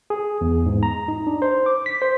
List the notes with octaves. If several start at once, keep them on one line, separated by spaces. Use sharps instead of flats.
G#4
E2
G#2
A#5
D#4
D4
C5
D6
B6
C5